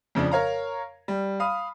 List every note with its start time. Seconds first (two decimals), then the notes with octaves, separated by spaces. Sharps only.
0.15 F2 C#3 F3 D4
0.31 A#4 C#5 F5 A#5
1.08 G3
1.40 F5 B5 D#6